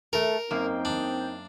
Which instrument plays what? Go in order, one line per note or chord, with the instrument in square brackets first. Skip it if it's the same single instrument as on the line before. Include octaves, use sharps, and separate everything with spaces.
[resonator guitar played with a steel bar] A3 A4 [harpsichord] A#4
[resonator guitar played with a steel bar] F#2 A#3 [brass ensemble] C4 D#4 G5
[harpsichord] D4